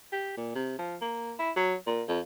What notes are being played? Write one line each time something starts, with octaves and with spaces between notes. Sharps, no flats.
G4
A#2
C3
F3
A#3
E4
F#3
A#2
F2